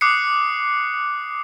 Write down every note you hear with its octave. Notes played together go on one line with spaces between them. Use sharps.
D6 D#6 F#6 C7 C#7